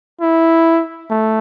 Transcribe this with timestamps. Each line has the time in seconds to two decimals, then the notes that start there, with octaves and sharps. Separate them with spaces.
0.21 E4
1.10 A3